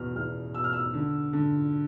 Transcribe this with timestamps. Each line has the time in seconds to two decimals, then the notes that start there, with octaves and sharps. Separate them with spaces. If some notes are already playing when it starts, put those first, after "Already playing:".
Already playing: E2 B2 F6
0.16 E2 F6
0.55 B2 E6
0.64 F6
0.73 E6
0.94 D3
1.33 D3